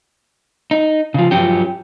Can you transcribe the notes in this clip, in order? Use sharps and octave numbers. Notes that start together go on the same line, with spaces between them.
D#4
C#3 F3
G2 F3 F#3 C#4 G4